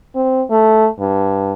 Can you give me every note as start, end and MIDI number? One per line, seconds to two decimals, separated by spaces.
0.15 0.43 60
0.51 0.88 57
1.00 1.53 43